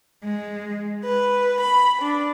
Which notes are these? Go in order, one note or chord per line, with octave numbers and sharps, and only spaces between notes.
G#3
B4
B5
D4